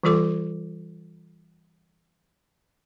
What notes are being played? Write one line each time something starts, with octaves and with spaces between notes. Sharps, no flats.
E3 G3 F4 A4 D6